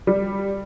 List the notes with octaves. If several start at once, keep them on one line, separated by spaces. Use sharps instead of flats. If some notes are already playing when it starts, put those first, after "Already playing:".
G3